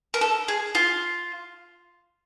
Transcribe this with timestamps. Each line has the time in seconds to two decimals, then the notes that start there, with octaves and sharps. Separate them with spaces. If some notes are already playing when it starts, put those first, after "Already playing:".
0.14 A#4
0.21 A4
0.48 G#4
0.75 F4